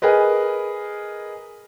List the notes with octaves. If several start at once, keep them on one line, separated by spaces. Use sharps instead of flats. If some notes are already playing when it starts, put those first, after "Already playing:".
G#4 A#4 B4 D#5